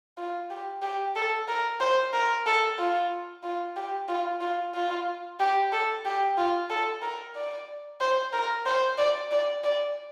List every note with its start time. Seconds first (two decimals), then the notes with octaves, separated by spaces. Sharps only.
0.17 F4
0.50 G4
0.82 G4
1.16 A4
1.48 A#4
1.80 C5
2.13 A#4
2.46 A4
2.78 F4
3.43 F4
3.76 G4
4.08 F4
4.41 F4
4.74 F4
5.39 G4
5.72 A4
6.05 G4
6.37 F4
6.70 A4
7.02 A#4
7.35 D5
8.00 C5
8.33 A#4
8.66 C5
8.98 D5
9.31 D5
9.64 D5